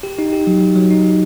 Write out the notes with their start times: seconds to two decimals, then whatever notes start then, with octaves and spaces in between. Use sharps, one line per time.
0.03 G4
0.19 D#4
0.33 G4
0.47 F#3
0.61 F#3
0.75 F#3
0.91 D#4
1.05 F#3